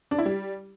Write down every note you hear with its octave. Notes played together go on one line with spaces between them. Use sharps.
D4
E4
G3